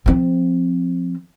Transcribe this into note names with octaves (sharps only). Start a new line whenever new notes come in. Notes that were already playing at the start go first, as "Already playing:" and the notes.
F3 C4